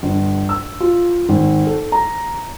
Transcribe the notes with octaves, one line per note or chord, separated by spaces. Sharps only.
G1
E6
F4
G#1
A4
A#5